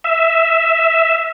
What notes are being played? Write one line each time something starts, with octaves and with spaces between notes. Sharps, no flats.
E5